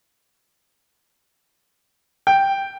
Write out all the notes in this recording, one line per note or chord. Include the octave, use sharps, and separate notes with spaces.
G5